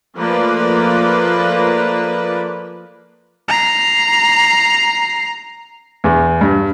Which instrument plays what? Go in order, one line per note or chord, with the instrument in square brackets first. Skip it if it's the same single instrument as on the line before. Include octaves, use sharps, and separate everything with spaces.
[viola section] F3 A3 A#3 B4 D5
[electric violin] A#5 C7
[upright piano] E2
G2